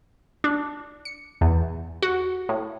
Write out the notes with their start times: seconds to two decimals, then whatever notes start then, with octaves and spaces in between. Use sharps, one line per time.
0.44 D4
1.05 C#7
1.41 E2
2.02 F#4
2.49 A2